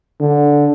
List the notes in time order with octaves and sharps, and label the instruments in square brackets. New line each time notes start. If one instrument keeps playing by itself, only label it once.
[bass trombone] D3